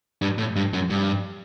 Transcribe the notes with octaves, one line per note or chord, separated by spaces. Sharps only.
G2
A2
G2
F#2
G2